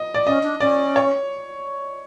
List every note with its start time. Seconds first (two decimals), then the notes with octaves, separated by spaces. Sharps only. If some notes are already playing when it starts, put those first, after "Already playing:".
Already playing: D#5
0.14 D5
0.27 C#4 D#5
0.43 D4
0.60 C#4 D5
0.96 C#5